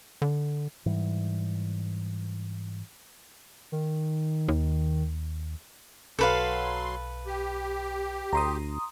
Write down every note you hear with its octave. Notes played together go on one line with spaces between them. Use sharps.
D3
G#2 E3 G3
D#3
D#2
B1 F#3 A4 B4 F5 C6
G4
D2 A#5 C6 D#6